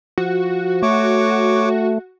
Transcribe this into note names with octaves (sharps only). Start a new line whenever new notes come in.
F3 F#4
A3 C#5 C#6 D6